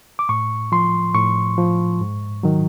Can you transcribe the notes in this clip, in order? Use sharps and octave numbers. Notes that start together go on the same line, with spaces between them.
D6
A2 C#6
F3 C6
A2 C#6
F3
G#2
D#3 F#3